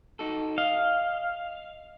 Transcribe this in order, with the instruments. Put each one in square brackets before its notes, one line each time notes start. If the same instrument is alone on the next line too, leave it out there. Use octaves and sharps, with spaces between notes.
[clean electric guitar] D#4 F#4 A4
[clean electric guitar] D#5 [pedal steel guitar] F5